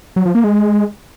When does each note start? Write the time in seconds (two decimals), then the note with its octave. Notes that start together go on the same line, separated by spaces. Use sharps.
0.16 F#3
0.26 F3
0.35 A#3
0.44 G#3